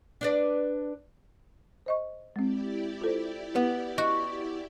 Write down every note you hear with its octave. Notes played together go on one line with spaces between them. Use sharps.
D4 B4 D5
C5 D#5 C#6
G#3 C4 E4 G4 D5
F4 A4 C5
B3
F#4 D#5